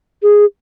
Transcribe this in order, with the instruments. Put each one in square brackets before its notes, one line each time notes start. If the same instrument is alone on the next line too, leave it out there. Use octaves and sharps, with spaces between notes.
[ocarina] G#4